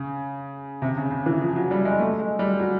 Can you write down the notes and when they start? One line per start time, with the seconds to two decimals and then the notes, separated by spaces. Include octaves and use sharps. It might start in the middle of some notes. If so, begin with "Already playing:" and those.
Already playing: C#3
0.82 C3
0.97 C#3
1.11 C#3
1.26 E3
1.41 F3
1.56 F#3
1.71 G3
1.85 G#3
1.99 A3
2.19 G#3
2.39 G3
2.59 F#3